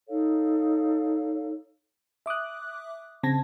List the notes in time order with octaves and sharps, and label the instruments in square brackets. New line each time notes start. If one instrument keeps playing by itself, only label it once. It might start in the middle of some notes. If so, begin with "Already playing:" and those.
[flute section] D#4 A4 C#5 F5
[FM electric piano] E5 D6 D#6 F#6
C#3 C4 A5 G#6 A#6